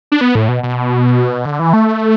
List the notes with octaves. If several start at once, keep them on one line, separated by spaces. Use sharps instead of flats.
D4
B3
A2
B2
B2
D3
E3
A3